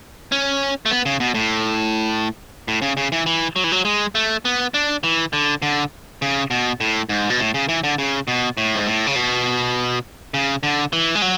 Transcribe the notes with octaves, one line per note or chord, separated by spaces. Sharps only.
C#4
A3
B3
C#3
B2
A2
A2
C#3
C#3
E3
E3
F#3
E3
F#3
G#3
A3
B3
D4
E3
D3
D3
C#3
B2
A2
G#2
B2
A2
C#3
E3
D3
C#3
B2
A2
G#2
A2
C#3
B2
C#3
D3
E3
G#3
F#3